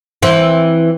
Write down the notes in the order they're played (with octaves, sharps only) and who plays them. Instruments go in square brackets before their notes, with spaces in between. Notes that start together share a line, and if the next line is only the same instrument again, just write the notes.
[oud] E3 C4